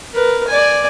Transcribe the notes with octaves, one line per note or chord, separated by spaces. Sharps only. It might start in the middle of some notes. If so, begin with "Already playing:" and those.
A#4 B4
D5 G#5